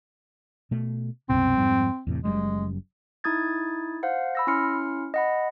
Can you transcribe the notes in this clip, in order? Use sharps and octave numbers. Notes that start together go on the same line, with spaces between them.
B2 A3
C2 F#2 B2 C4
F2 G#2 G3
E2 A2 C3
F#1 F#2 G3 G#3
D#4 E4 D#6 G#6 A6
C5 F5 F#5
B5 E6 A#6
C#4 E4 C6 F6 C#7
D#5 F#5 B5